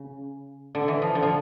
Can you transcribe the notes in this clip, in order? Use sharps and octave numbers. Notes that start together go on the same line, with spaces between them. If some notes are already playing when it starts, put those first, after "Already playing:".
Already playing: C#3
D3
E3
F3
D3
F3